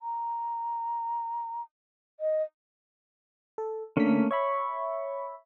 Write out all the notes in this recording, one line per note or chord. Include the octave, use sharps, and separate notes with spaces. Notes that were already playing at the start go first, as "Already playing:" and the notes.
A#5
D#5
A4
D3 A3 A#3 C#4 B6
C#5 E5 B5 C#6